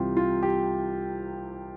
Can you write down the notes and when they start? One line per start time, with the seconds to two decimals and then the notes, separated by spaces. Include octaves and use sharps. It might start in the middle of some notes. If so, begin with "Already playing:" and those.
Already playing: C2 C3 E3 F4 G4
0.17 F4
0.43 G4